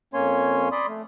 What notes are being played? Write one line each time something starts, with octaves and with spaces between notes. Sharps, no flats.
F2 A#3 C#4 C#5 G#5 C6
D5 B5 C6 D#6
A3